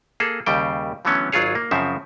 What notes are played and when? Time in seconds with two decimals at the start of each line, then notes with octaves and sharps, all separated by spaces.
0.20 A#3 G#4 A4
0.46 D#2 C#3 G3 G5
1.05 D3 E3 F#3 A3 B3 C#4
1.32 G#1 F#3 F4 G#4 C#5
1.55 A#3
1.71 F#2 C#3 F3 C4 E5